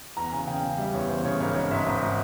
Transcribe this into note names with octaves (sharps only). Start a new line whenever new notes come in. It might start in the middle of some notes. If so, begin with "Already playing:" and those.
E2 A#5
C#3 G#5
C#3 G5
C#3
G3 E5
E2 C#5
E2 C5
C#3 C#5
G#1 C#5
G#1 C#5
G#2 E5
G#1